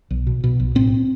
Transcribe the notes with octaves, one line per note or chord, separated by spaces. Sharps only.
B1
B2
B2
B1
A2 C4